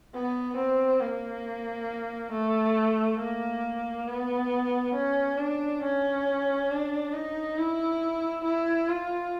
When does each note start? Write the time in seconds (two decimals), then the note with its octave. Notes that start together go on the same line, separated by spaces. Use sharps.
0.14 B3
0.57 C4
1.01 A#3
2.32 A3
3.19 A#3
4.08 B3
4.95 C#4
5.38 D4
5.83 C#4
6.70 D4
7.13 D#4
7.58 E4
8.45 E4
8.89 F4